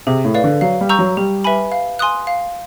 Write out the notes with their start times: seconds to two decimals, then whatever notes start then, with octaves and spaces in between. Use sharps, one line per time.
0.07 C3 G#4
0.25 A2
0.34 B4 D5 F5
0.44 D3
0.61 F#3 F5
0.81 G3
0.89 A#5 C#6 E6 G6
0.99 F#3
1.17 G3 G4
1.44 B4 E5 G#5 B5
1.72 F5
1.99 G#5 C6 D#6 F#6
2.27 F5